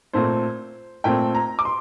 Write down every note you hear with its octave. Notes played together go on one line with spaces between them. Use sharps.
A#2 A3 C4 C5
A#2 A3 C4 G5
A#5
D6
C6